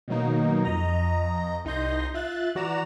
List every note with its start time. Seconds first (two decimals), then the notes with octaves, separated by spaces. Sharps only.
0.08 B2 D#3 F#3 A#3 D#4
0.65 F2 D#5 A#5
1.65 C2 D#4 D#5 C6 G6 A#6
2.14 F4 E5 F#6 A6
2.55 E3 F#4 D5 A#5 E7